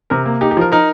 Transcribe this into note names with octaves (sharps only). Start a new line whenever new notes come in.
C3 A#4
A#3
D#4 G4
G4
F3 A#4
D#4 A#4